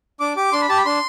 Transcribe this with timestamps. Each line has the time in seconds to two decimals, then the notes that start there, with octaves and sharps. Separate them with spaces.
0.20 D4 D6
0.37 G4 D6
0.53 D4 C6
0.62 B5
0.69 G4 A5
0.78 B5
0.85 D4 C6